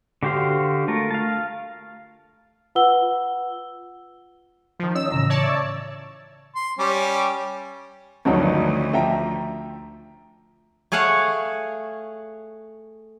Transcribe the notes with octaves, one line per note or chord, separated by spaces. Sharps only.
D3 F#4 G4 C5 F5
A3 F4 A#4
F5 A5
F4 B4 F#5 E6 G7
D#3 F3
C#4 D#5 E6
A2 C#3 E3 A#5
C#5 D5 A5
E5
C6
G3 C#4 G4
D2 G2 D#3 F3 F#3 D#4 C#5
F3 E5 G5 A#5
A3 G#4 C#5 F5 F#5